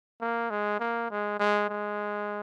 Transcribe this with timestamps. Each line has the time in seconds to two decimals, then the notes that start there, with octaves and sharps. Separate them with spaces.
0.21 A#3
0.51 G#3
0.80 A#3
1.10 G#3
1.39 G#3
1.69 G#3